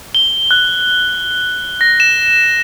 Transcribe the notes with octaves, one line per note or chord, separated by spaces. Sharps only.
G7
F#6
A#6
E7